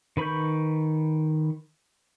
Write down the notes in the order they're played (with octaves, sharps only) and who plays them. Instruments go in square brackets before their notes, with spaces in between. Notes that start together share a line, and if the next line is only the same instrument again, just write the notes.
[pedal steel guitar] D#3 B4 B5 C#6 G6